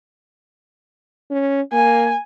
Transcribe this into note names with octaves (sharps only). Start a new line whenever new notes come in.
C#4
A#3 G#5